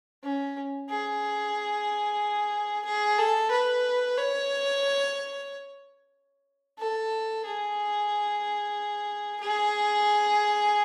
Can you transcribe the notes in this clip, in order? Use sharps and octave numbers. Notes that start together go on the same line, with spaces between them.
C#4
G#4
G#4
A4
B4
C#5
A4
G#4
G#4